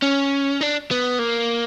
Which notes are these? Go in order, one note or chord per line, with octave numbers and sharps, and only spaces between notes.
C#4
D4
B3
A#3